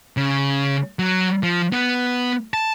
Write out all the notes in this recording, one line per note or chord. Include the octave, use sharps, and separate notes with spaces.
C#3
F#3
F3
B3
A5